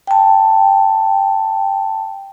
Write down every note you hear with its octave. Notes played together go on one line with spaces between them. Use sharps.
G5 A5